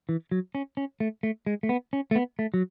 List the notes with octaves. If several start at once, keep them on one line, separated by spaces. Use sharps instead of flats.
E3
F#3
C#4
C#4
A3
A3
G#3
A3
B3
C#4
A3
B3
A3
F#3